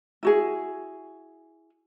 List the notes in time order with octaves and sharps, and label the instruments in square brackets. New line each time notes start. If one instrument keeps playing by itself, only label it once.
[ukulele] E4 F#4 G#4